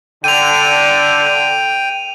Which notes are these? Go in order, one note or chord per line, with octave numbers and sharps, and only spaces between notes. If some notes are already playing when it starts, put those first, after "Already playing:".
D3 G5 D#7 F7